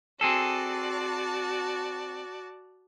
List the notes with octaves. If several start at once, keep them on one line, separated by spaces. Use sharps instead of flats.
C4 F#4 G#4 A4 D5 A5